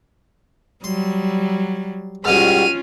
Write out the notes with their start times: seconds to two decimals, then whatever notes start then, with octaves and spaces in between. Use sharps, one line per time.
0.84 F#3 G3 C6
2.25 G#2 B2 G3 C#4 F4 F6 D#7